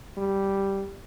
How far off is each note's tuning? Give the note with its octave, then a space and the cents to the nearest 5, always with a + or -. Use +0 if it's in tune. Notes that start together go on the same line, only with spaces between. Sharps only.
G3 -5